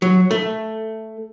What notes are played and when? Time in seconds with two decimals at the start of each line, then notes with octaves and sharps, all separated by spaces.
0.02 F#3
0.31 A3